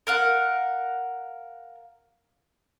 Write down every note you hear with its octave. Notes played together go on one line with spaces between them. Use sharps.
A#4 F5 F#5